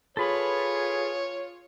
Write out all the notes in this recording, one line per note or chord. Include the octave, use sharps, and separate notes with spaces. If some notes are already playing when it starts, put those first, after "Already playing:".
F4 G#4 A4 B4 C#5 B5